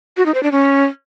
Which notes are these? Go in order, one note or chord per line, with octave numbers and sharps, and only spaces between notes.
F#4
D#4
C5
D4
C#4